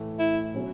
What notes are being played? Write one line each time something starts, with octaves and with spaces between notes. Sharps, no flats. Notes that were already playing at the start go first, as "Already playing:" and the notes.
Already playing: A2 E3 A3
E4
B2 F#3 C#4 F#4